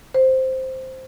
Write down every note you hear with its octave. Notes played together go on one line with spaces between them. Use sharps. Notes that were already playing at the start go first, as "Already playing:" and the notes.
C5